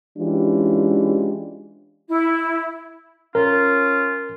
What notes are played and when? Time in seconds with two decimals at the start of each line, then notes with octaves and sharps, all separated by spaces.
0.18 E3 G#3 C#4 D4 F4 G4
2.09 E4
3.35 C#4 F4 A#4